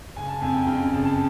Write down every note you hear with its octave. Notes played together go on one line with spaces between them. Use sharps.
F#1 G#5
A5
F2 G#5
G5
C#3 G5
F#1 A5
A5